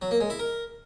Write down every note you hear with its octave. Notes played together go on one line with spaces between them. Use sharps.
F#3
A#3
G#3
E4
A#4